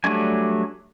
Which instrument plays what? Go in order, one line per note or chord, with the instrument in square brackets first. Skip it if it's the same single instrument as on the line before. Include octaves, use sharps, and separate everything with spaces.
[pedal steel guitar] F#3 G3 A3 D4 G#5